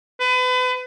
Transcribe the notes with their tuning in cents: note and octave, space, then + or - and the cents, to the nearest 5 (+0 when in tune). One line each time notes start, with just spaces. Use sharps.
B4 +35